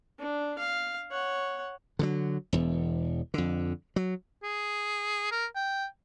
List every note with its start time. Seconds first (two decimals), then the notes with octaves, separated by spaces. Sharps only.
0.18 D4
0.58 F5
1.11 C#5 F#5
1.99 D3 D#3 F#3
2.53 E1 E2
3.34 F2 D3
3.96 F#3
4.43 G#4
5.32 A#4
5.55 G5